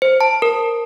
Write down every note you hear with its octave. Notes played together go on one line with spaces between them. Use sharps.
C5
A5
A#4